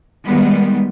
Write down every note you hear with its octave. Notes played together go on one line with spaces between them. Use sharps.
D#3 G3 G#3 B3